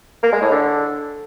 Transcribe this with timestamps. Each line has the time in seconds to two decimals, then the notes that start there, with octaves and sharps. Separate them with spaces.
0.23 A#3
0.32 G#3
0.42 A2
0.51 D3